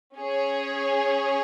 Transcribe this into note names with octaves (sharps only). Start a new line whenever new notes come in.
C#4 G#4 C#5